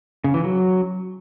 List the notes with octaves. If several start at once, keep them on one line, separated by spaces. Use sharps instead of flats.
C#3
E3
F#3